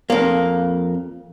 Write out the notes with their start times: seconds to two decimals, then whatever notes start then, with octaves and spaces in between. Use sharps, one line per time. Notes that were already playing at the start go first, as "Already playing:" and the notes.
0.10 F2 A#3